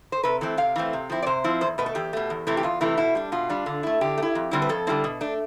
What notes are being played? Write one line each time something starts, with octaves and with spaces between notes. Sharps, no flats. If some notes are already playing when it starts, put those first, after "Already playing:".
C5
C3 B4
E3 A3 C4 A4
C3 F5
E3 A3 C4
C3
F3 C4 E4
D5
C3 C5
F3 C4 E4
E2 C5
B2 A3 B4
A4
E2 G4
B2 A3
E2
C3 E3 A3 E4
G4
E2 F4
C3 E3 A3 E4
B2 E4
G3 D4
B2 F4
G3 D4
D3
A3 E4
D3 G4
A3
E4
F2
D3 G3 C4 E4
B4
F2 A4
D3 G3 C4 E4
B2
A3 D4